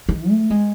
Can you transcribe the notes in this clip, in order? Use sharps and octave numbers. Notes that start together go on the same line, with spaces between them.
D#3
A3
G#3